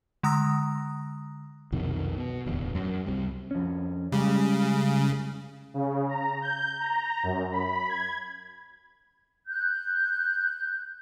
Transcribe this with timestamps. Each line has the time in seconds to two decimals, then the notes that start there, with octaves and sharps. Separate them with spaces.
0.23 D3 G#3 A#5 D#6 E6 A#6
1.72 B1 F2 C3 D#3
2.17 B2
2.46 D1 E2
2.75 F#2
3.06 C2 C3 G3
3.51 F2 C#4
4.12 C#3 G3 G#3
5.74 C#3
6.09 A#5
6.42 G6
6.80 A#5
7.23 F#2
7.52 B5
7.89 G#6
9.48 F#6 G6